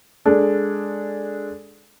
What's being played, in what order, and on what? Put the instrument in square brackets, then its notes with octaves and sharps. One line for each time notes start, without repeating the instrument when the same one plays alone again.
[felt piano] G#3 D4 A4